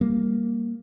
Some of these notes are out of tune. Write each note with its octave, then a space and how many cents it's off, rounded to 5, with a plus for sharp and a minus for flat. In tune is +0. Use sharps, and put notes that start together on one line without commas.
G3 +15 A#3 +0